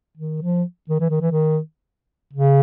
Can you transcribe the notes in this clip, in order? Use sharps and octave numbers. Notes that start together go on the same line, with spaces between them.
D#3
F3
D#3
E3
D#3
E3
D#3
C#3